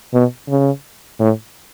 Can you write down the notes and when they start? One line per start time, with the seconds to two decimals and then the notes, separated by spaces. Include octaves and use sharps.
0.13 B2
0.49 C#3
1.20 A2